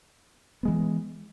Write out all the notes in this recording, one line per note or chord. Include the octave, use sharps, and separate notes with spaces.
E3 G#3 B3